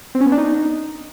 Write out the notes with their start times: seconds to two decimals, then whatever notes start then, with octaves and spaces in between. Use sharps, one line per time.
0.15 C4
0.20 C#4
0.26 B3
0.32 D4
0.38 D#4